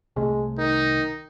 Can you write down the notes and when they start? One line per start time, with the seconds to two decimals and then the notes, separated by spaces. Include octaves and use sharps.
0.16 C2 C3 G#3 A3
0.58 D#3 D#4